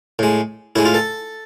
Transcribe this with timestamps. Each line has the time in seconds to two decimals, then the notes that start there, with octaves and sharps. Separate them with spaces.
0.19 A2 G#3
0.76 A2 G#3 E4
0.85 F4
0.94 A4